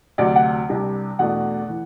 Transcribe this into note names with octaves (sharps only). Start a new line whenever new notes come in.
D2 C3 F#3 D5
F#5
C2 C3 G3 D4
E2 B2 A3 D4 F#5
E3